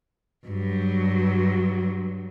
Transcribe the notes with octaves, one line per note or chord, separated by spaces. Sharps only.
G2 F#3